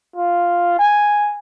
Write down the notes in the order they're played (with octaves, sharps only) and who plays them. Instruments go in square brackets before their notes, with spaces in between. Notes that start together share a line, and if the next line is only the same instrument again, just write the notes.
[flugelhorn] F4
G#5